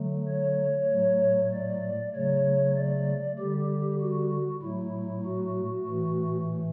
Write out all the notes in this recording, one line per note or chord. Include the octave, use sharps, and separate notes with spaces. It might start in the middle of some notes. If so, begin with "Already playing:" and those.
Already playing: D3 F#3 A3
C#5
A2 F#3 A3
D5
C#3 F#3 A3 C#5
D5
D3 G3 G4
F#4
A2 F#3 A3 E4
F#4
A2 E3 A3